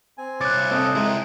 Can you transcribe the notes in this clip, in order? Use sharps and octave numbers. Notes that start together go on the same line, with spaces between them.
C4 G#5
C2 C#5 D6 F#6 A6
C4 A4 D#5
G#3 E4 A#4